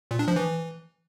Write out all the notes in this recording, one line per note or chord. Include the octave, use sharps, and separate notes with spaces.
A#2
D4
F3
E3